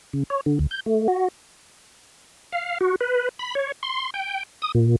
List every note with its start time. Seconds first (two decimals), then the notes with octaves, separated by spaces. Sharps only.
0.13 C#3
0.30 C#5
0.46 D3
0.59 D2
0.71 G6
0.86 A3
1.08 F#4
2.53 F5
2.81 F#4
3.01 B4
3.39 B5
3.55 C#5
3.83 C6
4.14 G5
4.62 D#6
4.75 A#2